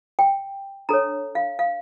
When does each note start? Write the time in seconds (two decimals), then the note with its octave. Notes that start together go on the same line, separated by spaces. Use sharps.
0.19 G5
0.89 D4 A4 C#5 A#5
1.35 F5
1.59 F5